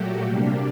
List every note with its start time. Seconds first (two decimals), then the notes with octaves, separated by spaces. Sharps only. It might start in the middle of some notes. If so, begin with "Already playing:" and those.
Already playing: A#2 F#3 A3 F#4 G4
0.24 C3 G3 A#3 D4